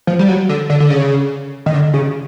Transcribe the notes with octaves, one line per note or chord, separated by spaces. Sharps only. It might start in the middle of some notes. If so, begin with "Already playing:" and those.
F3
G3
F#3
D3
D3
D3
C#3
D#3
D3
C#3